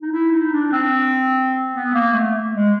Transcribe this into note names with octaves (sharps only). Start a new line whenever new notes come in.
D#4
E4
D#4
D4
C4
B3
A#3
A3
G#3